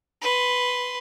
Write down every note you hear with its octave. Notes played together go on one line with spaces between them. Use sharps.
B4 C6